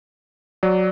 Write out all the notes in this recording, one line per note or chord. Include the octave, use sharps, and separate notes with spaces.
F#3 D5